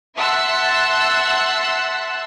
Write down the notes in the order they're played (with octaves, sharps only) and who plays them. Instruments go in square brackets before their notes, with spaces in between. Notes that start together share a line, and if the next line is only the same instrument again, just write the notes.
[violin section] E5 F#5 A5 C6 E6 F#6